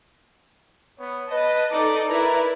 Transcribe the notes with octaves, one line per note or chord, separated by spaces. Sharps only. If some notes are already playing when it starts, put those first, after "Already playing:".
B3 C#5
B4 D#5 A5
D#4 A4 D5
E4 A#4 B4 D5 A#5